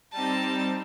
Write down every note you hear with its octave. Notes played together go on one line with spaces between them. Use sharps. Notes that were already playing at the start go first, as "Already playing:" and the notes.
G3 C4 D#4 A5